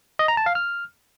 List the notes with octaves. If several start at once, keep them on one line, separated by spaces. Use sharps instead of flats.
D#5
A#5
A5
F5
F6